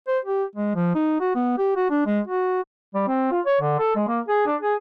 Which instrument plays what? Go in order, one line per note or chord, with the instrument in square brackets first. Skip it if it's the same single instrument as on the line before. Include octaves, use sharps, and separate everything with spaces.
[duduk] C5
G4
G#3
F3
D#4
F#4
B3
G4
F#4
D4
G#3
F#4
G3
C4
F4
C#5
D3
A4
G#3
A#3
G#4
D4
G#4